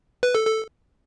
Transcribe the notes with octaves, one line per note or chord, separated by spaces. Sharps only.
B4
A4
A4